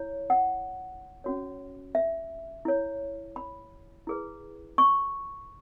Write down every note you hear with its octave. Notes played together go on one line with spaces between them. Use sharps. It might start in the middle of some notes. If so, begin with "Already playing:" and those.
Already playing: E4 C#5
F#5
C#4 F#4 C#5
E5
E4 C#5
B5
E4 G#4 B4
C#6